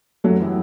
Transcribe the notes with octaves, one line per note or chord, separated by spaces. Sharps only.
F#2 F#3 A3
E3 B3 E4 G4